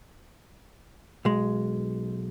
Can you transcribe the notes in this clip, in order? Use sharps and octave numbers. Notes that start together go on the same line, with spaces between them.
B1 G#3